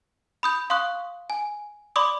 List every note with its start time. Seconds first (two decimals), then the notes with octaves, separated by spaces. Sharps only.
0.43 B5 D#6 G6
0.70 F5 C6 C#6 D#6 F#6
1.30 G#5
1.96 D5 B5 C6 D6 D#6